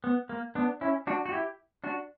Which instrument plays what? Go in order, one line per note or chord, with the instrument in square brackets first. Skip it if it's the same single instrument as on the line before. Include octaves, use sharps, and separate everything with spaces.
[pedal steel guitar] B3
A#3
B3 D4
C#4 E4
D4 F#4
F#4
E4 G4
D4 F#4